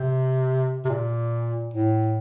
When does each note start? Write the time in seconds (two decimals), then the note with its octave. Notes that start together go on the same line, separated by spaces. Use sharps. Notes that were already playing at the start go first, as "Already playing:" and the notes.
Already playing: C3
0.85 C3
0.89 A#2
1.74 A2